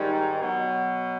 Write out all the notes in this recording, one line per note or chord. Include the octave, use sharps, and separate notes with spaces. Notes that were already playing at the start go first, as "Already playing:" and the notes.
Already playing: G#2 D#3 G3
B2 F#3